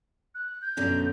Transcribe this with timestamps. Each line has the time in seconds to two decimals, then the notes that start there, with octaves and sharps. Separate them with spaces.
0.35 F#6
0.62 G6
0.77 F#2 B2 D3